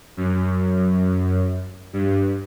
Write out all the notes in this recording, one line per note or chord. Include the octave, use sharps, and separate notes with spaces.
F#2
G2